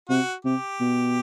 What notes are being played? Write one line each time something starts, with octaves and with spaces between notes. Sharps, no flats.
C3 F#4
C3 G4
B2